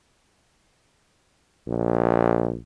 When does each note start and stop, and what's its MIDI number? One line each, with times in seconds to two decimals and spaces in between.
1.67 2.58 34